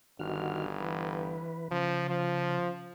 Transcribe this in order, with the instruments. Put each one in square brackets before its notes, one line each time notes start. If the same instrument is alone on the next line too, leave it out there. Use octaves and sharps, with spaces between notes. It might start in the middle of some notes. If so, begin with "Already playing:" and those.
[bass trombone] G1 [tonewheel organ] D#3 F#4 F6
[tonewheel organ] E3 B4
[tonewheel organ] C#3 [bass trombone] F3
[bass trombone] F3